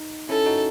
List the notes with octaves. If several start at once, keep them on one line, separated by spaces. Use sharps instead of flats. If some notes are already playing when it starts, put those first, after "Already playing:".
Already playing: D#4
C#4 E4 A4
D#4 F#4